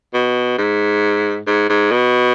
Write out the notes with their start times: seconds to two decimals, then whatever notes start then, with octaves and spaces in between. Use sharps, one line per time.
0.14 B2
0.58 G#2
1.47 G#2
1.69 G#2
1.92 B2